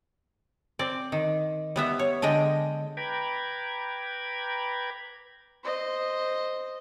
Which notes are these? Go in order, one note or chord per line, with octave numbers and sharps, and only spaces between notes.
C4 D5
D#3
G3 B3 E5
C#5
D3 G#3 D#5 G5
B4 G5 A#5 B5 D6 G#6
C5 D#5